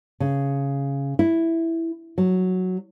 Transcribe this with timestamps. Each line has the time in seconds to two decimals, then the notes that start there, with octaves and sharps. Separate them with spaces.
0.20 C#3
1.19 E4
2.18 F#3